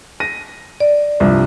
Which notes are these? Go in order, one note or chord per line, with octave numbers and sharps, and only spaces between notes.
A#6 D#7
D5
C2 G2 F3